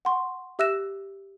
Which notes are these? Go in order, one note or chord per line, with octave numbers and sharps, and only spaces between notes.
F#5 C6 C#6
G4 E5 E6 F#6 A#6 E7